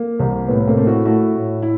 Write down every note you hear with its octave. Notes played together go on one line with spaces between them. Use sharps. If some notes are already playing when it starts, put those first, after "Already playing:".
Already playing: A#3
C2
A2 B3
A#3 C4
A3
E4 F#4
A3 E4 F#4
A2
E4